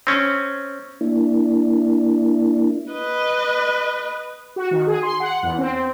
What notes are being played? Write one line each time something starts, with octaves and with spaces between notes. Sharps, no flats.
C4 C#4
A#3 D4 E4
B4 D#5
F#4
D#3
G#4
C6
F#5
E2
C4